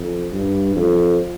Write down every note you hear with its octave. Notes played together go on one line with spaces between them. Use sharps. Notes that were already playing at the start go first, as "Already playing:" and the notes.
Already playing: F2
G2
F2